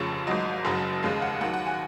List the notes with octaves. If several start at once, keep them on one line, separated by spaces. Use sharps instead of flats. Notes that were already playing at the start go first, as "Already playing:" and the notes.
Already playing: F1 F2 C#3 C#5
G#1 G#2 F#3 D#5
F#1 F#2 C#3 F#3
F1 D#2 C#3 G#3 F5
F#5
D#2 D#3 F#3 F#5
F#5
G#5